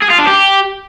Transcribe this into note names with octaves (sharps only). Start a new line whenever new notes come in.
G#4
F4
D4
G4